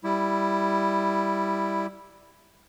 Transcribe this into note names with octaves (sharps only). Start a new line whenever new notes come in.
G3 E4